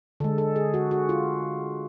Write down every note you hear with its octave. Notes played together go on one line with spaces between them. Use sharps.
D3 G#3 A4
A4
G#4
F#4
F#4
F4